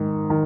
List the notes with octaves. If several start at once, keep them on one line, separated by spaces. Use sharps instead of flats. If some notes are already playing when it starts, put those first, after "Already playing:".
Already playing: G#2 D#3
D#3